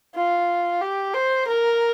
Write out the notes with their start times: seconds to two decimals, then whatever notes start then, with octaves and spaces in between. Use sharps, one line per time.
0.15 F4
0.81 G4
1.14 C5
1.47 A#4